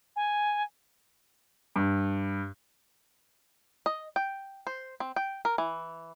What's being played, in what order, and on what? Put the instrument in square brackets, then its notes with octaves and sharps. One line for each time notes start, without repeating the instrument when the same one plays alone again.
[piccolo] G#5
[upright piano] G2
[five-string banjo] D#5
G5
C5
C4
G5
A#4
E3